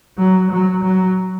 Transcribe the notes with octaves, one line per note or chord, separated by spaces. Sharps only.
F#3
F#3
F#3